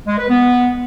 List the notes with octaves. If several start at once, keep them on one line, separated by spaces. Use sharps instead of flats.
G#3
B4
B3